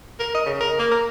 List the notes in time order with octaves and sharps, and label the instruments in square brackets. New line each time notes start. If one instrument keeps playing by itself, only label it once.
[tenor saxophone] A#4
D#5
C#3
A#4
A#3
A#4